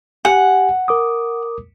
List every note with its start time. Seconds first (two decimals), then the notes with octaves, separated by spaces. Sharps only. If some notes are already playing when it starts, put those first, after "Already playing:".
0.25 G4 F#5 G#5
0.88 A#4 D6 D#6